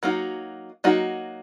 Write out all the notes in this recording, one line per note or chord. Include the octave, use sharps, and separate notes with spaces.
F#3 A#3 D#4 F#4
F#3 A#3 D#4 F#4